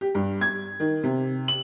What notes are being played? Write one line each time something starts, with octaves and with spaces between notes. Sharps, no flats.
G4
G2
G#6
D#3
C3
F#7